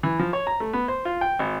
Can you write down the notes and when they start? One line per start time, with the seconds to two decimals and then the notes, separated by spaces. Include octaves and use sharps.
0.03 E3
0.19 F3
0.33 C#5
0.47 A#5
0.60 A3
0.73 B3
0.88 C5
1.05 F4
1.21 G5
1.39 G#1